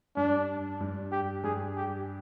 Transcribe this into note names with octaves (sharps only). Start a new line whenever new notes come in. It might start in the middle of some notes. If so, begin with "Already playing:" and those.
G2 D4
G2
G4
G2 G#4
G4